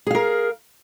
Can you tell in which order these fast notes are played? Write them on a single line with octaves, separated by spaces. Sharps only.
G#4 F5 A#4